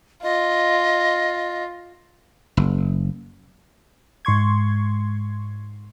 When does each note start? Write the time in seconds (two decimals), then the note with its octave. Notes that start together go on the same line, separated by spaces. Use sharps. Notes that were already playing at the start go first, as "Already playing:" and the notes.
0.23 F4 D#5
2.57 F#1
4.25 G#2 C6 C#6 G#6